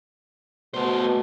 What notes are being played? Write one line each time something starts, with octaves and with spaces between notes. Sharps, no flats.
B2 A3 C5